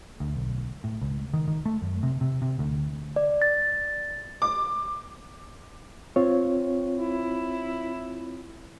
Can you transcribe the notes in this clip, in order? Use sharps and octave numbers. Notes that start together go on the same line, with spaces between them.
D2
B1
A2
C#2
D#3
D#3
A3
F#2
C3
C3
C3
D2
D5
A6
D6
C4 F4 C#5
E4